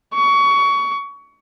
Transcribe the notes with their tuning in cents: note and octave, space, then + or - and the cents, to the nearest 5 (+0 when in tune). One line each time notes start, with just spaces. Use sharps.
C#6 +25